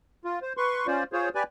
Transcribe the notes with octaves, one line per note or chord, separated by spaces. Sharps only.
F4
C5
B4 C6 C#6
C#4 F4 C5 D5
F4 G#4 C5 C#5
G4 B4 D5 G#5